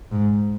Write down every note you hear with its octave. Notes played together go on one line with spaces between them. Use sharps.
G#2